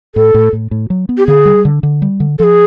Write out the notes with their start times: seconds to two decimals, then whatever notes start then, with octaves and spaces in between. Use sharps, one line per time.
0.15 A2 A4
0.34 A2
0.53 A2
0.71 A2
0.90 F#3
1.09 B3
1.18 G4
1.27 D3 G#4
1.45 G3
1.65 D3
1.83 D3
2.02 G3
2.20 D3
2.39 F3 G#4 A4